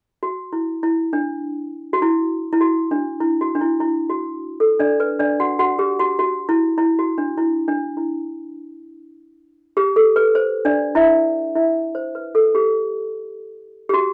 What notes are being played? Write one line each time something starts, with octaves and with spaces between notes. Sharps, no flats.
F#4
E4
E4
D4
F#4
E4
E4
F#4
D4
E4
F#4
D4
E4
E4
F#4
A4
D4 D5
B4
D4 D5
F#4 F#5
F#4 F#5
G4
F#4
F#4
E4
E4
F#4
D4
E4
D4
E4
G4
A4
B4
C5
D4 D5
E4 E5
E4 E5
C5
B4
A4
G4
G4
F#4